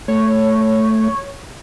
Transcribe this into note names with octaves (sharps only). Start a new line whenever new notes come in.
A3 C#5